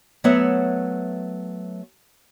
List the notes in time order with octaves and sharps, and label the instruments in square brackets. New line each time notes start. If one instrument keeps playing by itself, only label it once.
[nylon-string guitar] F#3 A3 B3 C#5 E5 F#5